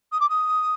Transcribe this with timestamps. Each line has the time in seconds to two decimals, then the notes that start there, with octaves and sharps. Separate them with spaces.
0.12 D#6
0.20 D6
0.30 D#6